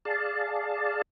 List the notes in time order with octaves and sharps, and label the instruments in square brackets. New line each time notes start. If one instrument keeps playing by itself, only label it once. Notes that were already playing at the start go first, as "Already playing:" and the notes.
[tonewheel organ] G#4 D5 F5 A5